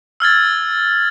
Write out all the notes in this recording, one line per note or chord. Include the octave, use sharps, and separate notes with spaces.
E6 F6 G#6 A6